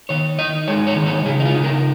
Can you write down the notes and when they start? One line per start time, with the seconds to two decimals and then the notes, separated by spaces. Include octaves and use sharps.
0.09 D#3 C#5
0.39 D#4 D#5
0.67 G#3 C#5
0.87 C#5
0.96 D#3
1.06 C#5
1.25 C#3 G#4
1.40 D#4
1.45 F4
1.55 D#4
1.64 A#4